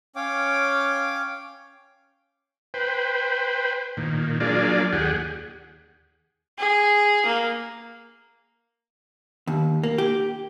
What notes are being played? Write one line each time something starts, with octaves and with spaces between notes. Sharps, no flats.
C#4 C#5 F5 G5 D6
B4 C5 G5
A#2 D#3
F#3 A#3 D4 F4 G#4 D5
D#2 G4 G#4 F#5
G#4
A#3
D#2
A#3
G4